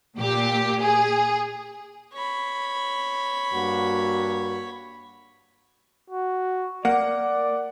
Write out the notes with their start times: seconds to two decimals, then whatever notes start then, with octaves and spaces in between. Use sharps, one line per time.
0.17 A#2 G4
0.81 G#4
2.13 C#5 B5
3.53 G2 A#3 F#4
6.10 F#4
6.85 A#3 D5 F#5